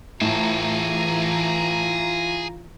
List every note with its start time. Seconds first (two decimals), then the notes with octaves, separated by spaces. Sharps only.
0.21 A2 E3 F4 G#4 A5 A#5